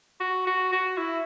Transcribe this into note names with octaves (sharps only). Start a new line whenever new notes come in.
F#4
F#4
F#4
E4